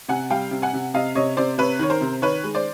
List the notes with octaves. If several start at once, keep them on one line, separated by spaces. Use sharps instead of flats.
C3 F#5 G#5
G3 F5 G5
C3
F#5 G#5
C3
C3 D#5 F5
C3 C#5 D#5
C3 C5 D5
C3 B4 C#5
D#3 C#5
A#4 C5
C3
D#3 B4 C#5
G#3
C5 D5